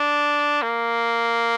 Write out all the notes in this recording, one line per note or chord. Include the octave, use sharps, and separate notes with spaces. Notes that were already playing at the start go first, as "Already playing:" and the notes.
Already playing: D4
A#3